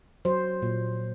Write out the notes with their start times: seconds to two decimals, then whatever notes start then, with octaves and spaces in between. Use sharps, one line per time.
0.25 F#3 C5
0.62 A#2